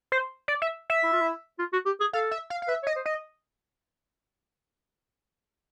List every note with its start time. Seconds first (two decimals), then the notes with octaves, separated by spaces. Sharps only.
0.12 C5
0.48 D5
0.62 E5
0.90 E5
1.03 E4
1.13 F4
1.21 E4
1.59 F4
1.73 F#4
1.86 G4
2.00 G#4
2.13 A4 F5
2.31 E5
2.50 F5
2.62 F5
2.68 B4 E5
2.83 C#5
2.87 D#5
2.96 C5
3.06 D#5